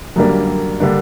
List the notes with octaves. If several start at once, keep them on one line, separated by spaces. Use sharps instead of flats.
F#2 D3 G3 A#3 D4
D3 G3 A#3 D4